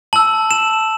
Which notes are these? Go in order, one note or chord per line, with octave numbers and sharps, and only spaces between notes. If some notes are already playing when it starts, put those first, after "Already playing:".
A5 E6 F#7
E7